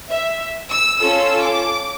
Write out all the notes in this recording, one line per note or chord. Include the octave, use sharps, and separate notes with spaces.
E5
E6
C#4 F4 A4 E6
D6